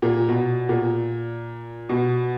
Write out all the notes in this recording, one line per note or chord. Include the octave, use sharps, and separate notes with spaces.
A#2
B2
A#2
B2